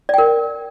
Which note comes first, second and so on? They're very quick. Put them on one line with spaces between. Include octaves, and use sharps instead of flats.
D5 G5 A#4